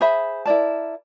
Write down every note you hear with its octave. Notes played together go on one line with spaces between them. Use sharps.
G#4 C5 E5 B5
E4 A#4 D5 A5